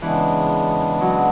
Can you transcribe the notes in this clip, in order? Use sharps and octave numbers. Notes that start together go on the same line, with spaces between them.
C#3 E3 G#3 B3 D4
F#3